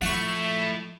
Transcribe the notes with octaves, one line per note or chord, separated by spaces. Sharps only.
F3 A3 E4 F#5 C#6